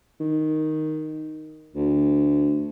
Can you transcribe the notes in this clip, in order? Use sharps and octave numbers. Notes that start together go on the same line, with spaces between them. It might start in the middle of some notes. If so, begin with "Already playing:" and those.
D#3
D2